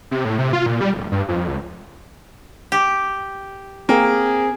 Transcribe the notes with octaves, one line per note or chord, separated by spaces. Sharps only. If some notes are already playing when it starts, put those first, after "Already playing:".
C3
A2
C3
F4
A#2
G3
D1
G2
F2
C#2
G4
A#3 C4 G#4